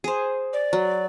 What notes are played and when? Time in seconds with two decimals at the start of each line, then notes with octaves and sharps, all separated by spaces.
0.04 G#4 C5
0.53 D5
0.73 F#3